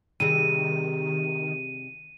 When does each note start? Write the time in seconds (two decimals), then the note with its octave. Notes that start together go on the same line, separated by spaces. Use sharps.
0.20 C3 D#3 G3 G#4 D#7